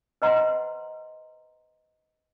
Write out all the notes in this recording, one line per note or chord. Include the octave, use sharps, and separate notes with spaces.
B4 C5 D#5 F#5 A#5 C6